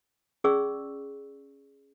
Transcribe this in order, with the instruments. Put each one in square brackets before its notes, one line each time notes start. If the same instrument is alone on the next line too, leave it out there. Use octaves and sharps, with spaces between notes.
[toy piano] C#4 G#4 D5 C#6 E6